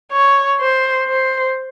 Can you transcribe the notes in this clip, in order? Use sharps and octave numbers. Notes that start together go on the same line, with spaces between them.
C#5
C5
C5